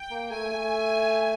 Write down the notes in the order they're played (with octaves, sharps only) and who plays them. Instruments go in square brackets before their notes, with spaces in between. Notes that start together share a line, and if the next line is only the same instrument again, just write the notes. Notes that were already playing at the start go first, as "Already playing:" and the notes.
Already playing: [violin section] G5
[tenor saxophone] A#3
[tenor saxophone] A3 [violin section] G#5
[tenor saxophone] A3